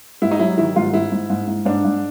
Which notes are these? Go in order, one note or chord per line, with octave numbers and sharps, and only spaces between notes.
G#2 E4
D#4
F#3 E4
D#3 E4
G#2 F4
G#2 E4
G#2
G#2
G#2
G#2 D4
G#2